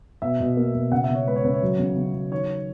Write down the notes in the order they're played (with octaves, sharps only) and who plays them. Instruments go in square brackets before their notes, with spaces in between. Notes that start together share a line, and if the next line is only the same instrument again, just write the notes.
[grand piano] B2 E5
B2
A#3
B2
C#3 F#5
E5
C#3
C#5
G#3 B4
C#5
C#3 B4
C#5
F#3
C#3
C#3
F#3
D#3 C#5